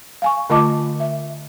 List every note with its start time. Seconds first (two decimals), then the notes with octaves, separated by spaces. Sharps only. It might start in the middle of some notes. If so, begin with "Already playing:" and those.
0.22 F5 G#5 C#6
0.50 D3 A3 F4 D#5 A5 D6
1.00 E5